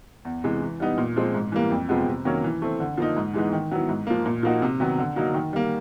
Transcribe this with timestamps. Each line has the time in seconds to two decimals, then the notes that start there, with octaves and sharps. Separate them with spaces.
0.25 E2
0.44 C3 E3 G#3
0.62 E3
0.80 G3 B3 D#4
0.98 A#2
1.16 F3 G#3 C4
1.35 G#2
1.52 E3 G3 A#3
1.71 F2
1.89 C3 F3 G#3 B3
2.07 C3
2.25 D#3 F#3 A#3 C#4
2.44 E3
2.62 A3 C4
2.80 D3
2.98 F3 A#3 D#4
3.17 G#2
3.34 E3 G#3 B3 D#4
3.52 D#3
3.71 F#3 B3 E4
3.89 G#2
4.07 F3 A#3
4.26 A#2
4.43 F3 A#3 D#4 F#4
4.62 C3
4.80 D#3 F#3 B3
4.98 D3
5.16 F#3 A#3 D#4 F#4
5.34 D#3
5.53 G3 A#3